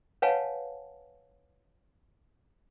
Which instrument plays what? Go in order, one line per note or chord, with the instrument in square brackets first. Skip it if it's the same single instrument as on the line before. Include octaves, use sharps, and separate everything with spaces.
[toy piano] B4 C#5 F5 F#5 G#5 A5